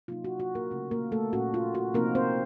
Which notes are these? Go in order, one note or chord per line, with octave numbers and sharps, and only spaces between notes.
C3 F#3 A#3 D#4 F4
F#4
F#4
A#3 A#4
C#3 A3 C#4
A#3 A#4
A3 A4
A#2 A3 C#4 F#4
F4
F#4
C3 F3 A#3 C4 D#4 A#4
C4 C5